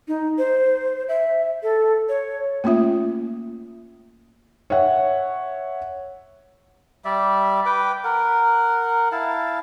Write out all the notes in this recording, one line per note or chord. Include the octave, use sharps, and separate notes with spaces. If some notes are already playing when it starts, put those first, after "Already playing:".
D#4
C5
E5
A4
C#5
A3 A#3 C#4 F4 E5
C#5 E5 F#5
G3 D5 E5
B4 G5 D6
A#4 F#5
E4 F5 A5